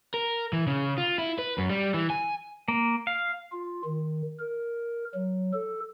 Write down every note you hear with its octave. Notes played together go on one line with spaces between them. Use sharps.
A#4
E3
C#3
F4
E4
B4
F#2
G3
E3
G#5
A#3
F5
F4
D#3
A#4
F#3
A4